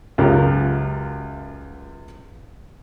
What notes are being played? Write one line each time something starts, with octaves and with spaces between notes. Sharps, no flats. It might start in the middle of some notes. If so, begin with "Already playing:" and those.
C#2 F#2 F4 G4 A#4